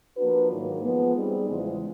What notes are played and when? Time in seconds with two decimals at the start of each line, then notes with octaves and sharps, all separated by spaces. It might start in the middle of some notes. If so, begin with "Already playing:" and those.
0.16 F3 A#3 D4 F#4 B4
0.49 G#2 D#3 F#3 A#3
0.83 F3 G#3 B3
1.15 G3 C4 D#4 G#4
1.48 E2 C#3 F3 G#3